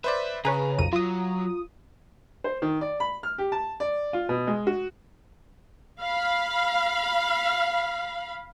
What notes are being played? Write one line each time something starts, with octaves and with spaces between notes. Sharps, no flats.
B4 C5 D5 E5
C#3 G#4 B4 C#5 A#5
B1 F2 D#7
F#3 F4 D#6
C5
D#3
D5
B5
F6
G4
A5
D5
F4
B2
G#3
F#4
F5 B5